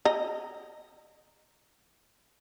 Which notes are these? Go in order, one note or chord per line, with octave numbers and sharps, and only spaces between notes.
D#5 A#5